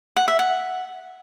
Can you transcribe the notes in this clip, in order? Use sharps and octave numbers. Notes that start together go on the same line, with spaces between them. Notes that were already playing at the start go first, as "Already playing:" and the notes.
F#5
E5
F#5